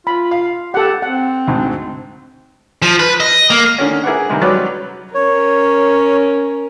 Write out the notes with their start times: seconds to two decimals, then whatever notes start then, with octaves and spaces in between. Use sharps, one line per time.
0.07 F4 B5
0.31 F5
0.74 G4 A4 F#5
1.02 C4 F#5
1.47 D2 G#2
2.82 F3
3.00 B4
3.20 D#5
3.50 A#3
3.78 D3 D#3 C#4
4.04 E4 G#4 A#4 B4 D5 F#5
4.29 C3 D#3 G3 G#3
4.42 F#3 G3 C#4 B4 D5
5.14 C#4 A#4 C#5